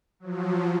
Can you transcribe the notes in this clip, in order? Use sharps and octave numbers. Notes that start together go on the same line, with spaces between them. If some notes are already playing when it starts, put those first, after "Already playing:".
F3 F#3